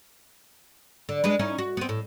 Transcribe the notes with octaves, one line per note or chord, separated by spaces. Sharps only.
D3
G#3 D4 B4
C#4 D#4 E4
F#4
B3 C4
A2